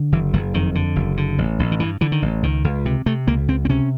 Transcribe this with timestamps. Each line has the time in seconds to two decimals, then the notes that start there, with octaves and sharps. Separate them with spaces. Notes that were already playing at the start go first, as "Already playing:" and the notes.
Already playing: D3
0.12 F#1 E3
0.33 F#1 F#3
0.54 F2 D#3
0.75 D3
0.96 F#1
1.17 D3
1.38 A1
1.59 A1
1.72 D#3
1.80 G2 E3
2.01 D3 E3
2.12 D#3
2.22 A1
2.43 C#2 D#3
2.64 C#2
2.85 C3
3.06 C3 A3
3.27 C#2 A#3
3.48 C#2 C4
3.65 C4
3.69 C3 C#4